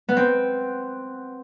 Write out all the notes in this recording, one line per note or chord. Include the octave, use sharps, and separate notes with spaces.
B3
C4